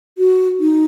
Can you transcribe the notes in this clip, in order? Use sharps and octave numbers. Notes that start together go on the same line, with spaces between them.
F#4
D#4